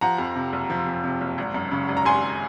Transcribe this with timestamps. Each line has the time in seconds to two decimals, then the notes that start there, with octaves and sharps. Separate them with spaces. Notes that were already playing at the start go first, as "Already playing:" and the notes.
0.01 F3 F#5 A#5
0.18 F2
0.35 C3
0.53 F#1
0.70 F3
0.86 F2
1.04 C3
1.21 F#1
1.38 G#1
1.54 F#2
1.71 C#3
1.89 G#1
1.97 A#5
2.05 G#1 G#5 C6